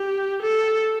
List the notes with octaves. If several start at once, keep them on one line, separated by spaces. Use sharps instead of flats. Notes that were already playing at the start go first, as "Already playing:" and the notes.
Already playing: G4
A4